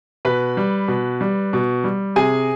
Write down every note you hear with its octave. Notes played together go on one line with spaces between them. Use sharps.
B2 B4 B5
G3
B2
G3
B2
G3
C3 G#4 G#5